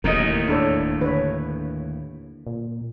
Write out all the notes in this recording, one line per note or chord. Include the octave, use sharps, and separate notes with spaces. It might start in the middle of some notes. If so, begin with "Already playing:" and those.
E1 D#2 A2 A#4 D#5
D4 A4 C#5
D3 B4 C#5
A#2